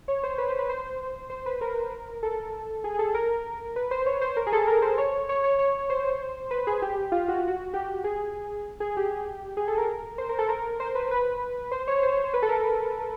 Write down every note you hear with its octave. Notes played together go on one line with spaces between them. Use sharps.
C#5
C5
B4
C5
B4
C5
C5
B4
A#4
A4
G#4
G#4
A4
A#4
B4
C5
C#5
C5
A#4
G#4
A4
A#4
C5
C#5
C#5
C#5
C#5
C5
B4
G#4
G4
F4
F#4
F4
F#4
G4
G4
G#4
G#4
G4
G#4
A4
A#4
C5
A#4
A4
A#4
C5
B4
B4
C5
C#5
C5
C#5
C5
B4
A4
A#4